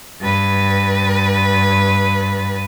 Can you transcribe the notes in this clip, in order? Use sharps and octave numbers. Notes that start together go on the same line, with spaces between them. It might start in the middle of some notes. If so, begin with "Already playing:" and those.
G2 B4